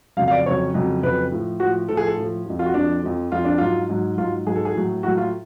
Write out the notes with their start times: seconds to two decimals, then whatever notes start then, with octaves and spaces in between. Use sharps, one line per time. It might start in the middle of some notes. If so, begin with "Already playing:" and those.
0.17 F2 C#3 F#3 F5
0.28 F5
0.31 D5
0.45 F2 C#3 F#3 C#5
0.74 F2 C#3 F#3
1.03 F2 C#3 F#3 B4
1.31 A2 F3
1.60 A2 F3 F#4
1.88 A2 F3 A4
1.97 G#4
2.07 A4
2.17 A2 F3
2.46 F2 F3
2.59 F4
2.66 F#4
2.74 F2 F3 D4
3.03 F2 F3
3.32 F2 F3 F4
3.45 D4
3.58 G#2 F#3 F4
3.89 G#2 F#3
4.17 F#3 F4
4.22 G#2
4.46 G#2 F#3 G#4
4.56 A4
4.65 G#4
4.75 A2 F#3
5.03 A2 F#3 F#4
5.17 F4